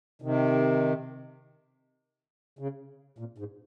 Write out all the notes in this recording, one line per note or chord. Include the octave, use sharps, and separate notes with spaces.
C3 D#3
C#3
A#2
G#2